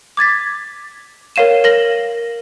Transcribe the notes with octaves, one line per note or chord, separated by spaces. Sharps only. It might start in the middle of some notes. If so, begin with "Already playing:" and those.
D6 G#6 A6 B6
A#4 C#5 F5 D#7 E7
A#4 A#6 F#7